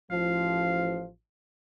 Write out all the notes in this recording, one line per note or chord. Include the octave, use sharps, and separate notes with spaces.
A1 F3 F5